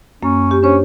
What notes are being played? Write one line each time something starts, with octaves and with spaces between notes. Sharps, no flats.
F#2 A#3 C#4
G4
C#4 D4 C5 C#5